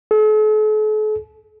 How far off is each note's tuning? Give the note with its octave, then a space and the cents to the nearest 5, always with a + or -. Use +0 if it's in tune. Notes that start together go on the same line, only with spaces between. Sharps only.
A4 -45